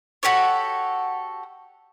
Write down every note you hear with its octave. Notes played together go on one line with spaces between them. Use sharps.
F#4 G4 A4 C#5